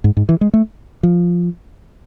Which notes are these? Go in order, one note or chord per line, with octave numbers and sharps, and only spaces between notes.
G#2
G#2
E3
G#3
A3
F3